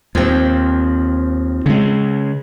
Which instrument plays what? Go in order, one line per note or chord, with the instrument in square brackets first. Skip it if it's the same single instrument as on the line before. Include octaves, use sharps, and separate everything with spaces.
[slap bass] D#2 [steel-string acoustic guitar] F3 C4
[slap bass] C#3 G#3